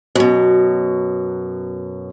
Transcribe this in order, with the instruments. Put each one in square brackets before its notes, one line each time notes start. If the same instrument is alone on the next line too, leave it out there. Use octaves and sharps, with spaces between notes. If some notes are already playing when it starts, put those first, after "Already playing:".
[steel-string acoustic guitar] F#2 B2